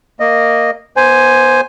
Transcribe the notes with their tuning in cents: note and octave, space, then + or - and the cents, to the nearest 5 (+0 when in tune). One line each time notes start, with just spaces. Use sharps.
A#3 -5 D#5 -10
B3 -25 C5 +0 G#5 +0